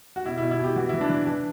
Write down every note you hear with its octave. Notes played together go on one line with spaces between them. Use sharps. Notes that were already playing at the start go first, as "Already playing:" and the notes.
F#4
B2 E4
E4
B2
E4
B2 G4
E3 F#4
E4
E3
D4
E3
E3 D4